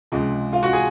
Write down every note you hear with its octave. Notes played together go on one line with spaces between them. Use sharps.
C#2 C3 F3 G#3
F4
F#4
G#4